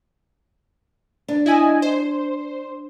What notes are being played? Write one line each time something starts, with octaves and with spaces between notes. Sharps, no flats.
D4
E4 D#5 G#5
C5